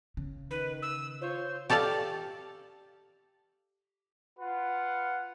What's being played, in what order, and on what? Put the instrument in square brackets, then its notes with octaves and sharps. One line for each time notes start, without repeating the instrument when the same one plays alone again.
[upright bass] C#3
[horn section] D#3 [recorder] B4
[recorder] E6
[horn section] F4 C#5 [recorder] C5
[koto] G4 A4 D5 F5 A5
[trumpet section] F4 B4 F#5